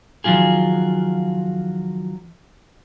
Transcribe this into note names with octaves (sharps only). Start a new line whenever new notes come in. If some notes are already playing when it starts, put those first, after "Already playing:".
D#3 F3 F#3 F4 G#4